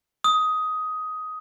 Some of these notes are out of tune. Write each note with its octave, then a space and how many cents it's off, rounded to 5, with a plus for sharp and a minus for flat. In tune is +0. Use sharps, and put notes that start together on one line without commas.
D#6 +10